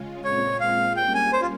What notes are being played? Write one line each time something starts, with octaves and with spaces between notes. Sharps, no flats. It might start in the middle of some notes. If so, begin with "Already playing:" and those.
Already playing: C#3 G#3 C#4 F4
A#2 G#3 C4 F4 C#5
F5
G3 A#3 C#4 G5
G#5
C5
F4